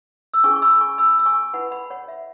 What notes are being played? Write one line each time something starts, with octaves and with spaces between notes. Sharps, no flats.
E6
C#4 E4 G#4 G#5 C#6
C#6
B5 E6
G#5 C#6
B5 E6
E6
G#5 C#6
E4 B4 F#5 B5
F#5 B5
C#5 F#5
E5